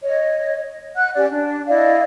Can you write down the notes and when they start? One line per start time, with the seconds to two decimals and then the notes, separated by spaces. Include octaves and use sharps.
0.03 C#5 D#5
0.96 F#5 F#6
1.16 C#4 G4 D5
1.31 D4
1.68 E4 D5 D#5 F5